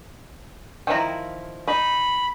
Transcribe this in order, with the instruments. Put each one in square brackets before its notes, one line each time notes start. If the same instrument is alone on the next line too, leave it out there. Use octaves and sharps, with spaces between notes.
[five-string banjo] D#3 F3 E4 [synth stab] G5 A#5
[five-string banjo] D#4 [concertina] B5